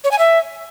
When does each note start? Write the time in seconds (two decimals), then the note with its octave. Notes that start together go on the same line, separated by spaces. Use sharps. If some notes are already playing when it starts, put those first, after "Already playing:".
0.04 C#5
0.11 G#5
0.19 E5